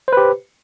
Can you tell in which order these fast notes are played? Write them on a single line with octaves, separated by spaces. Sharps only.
C5 B4 G4